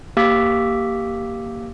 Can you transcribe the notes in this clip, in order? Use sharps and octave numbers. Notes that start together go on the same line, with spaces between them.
A#3 G4 F5 D6 E6 B6